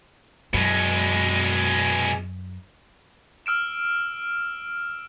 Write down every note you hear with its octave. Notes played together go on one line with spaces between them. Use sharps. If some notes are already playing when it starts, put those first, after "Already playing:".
F#2 B2 G#3
E6 F6 D7 E7